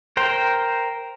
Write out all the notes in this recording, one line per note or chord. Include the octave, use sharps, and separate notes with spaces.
A#4 C5 G5